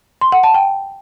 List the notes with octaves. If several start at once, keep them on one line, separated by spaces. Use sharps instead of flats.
C6
F#5
A5
G5